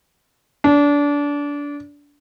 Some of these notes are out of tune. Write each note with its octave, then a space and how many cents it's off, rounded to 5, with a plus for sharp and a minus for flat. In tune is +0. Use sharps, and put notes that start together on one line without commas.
D4 -25